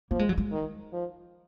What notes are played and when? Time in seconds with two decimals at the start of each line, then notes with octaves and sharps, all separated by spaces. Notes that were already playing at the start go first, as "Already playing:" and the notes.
0.11 F3 A#3
0.19 G#3
0.29 F#3
0.38 G#3
0.52 D#3
0.92 F3